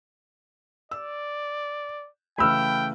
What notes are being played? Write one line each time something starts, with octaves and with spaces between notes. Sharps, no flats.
D5 E6
C#3 E3 A3 G5 B5 E6 F6